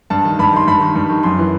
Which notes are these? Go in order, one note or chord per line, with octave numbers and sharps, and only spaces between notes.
G2 A5
D#3
G2 B5
D#3 C6
G2 B5
D#3
G2
D#3
F#2 C6
E3